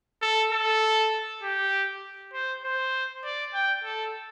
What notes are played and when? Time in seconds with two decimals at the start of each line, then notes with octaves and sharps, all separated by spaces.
0.22 A4
0.52 A4
1.43 G4
2.33 C5
2.64 C5
3.24 D5
3.54 G5
3.84 A4